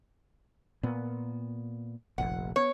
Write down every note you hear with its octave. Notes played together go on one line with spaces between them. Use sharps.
A#2 B3
F1 A#1 F#5
B3 C#5